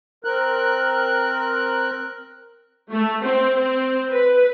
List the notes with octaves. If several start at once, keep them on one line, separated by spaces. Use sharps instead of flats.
C4 A#4 F#6
A3
C4
C4
B4